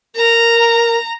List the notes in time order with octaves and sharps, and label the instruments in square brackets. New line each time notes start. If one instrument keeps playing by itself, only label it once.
[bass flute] A#4 [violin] A#5